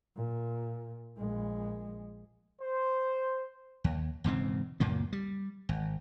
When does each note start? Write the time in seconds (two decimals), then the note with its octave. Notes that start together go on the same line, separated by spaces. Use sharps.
0.16 A#2
1.17 A#1 G#3
2.61 C5
3.84 D#2
4.24 E1 G#2 C#3 C4
4.80 C#2 F#2 A#2 A#3
5.13 G3
5.69 G#1